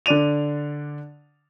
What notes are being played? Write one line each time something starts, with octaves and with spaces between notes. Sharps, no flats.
D3 D4 D5 D#7 F7